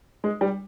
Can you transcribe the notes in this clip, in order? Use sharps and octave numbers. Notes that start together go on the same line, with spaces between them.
G#3
G3